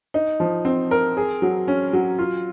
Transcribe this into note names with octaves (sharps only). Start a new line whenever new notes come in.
D#4
F3
C4
A#4
G#4
F#3
C#4
F#3
F4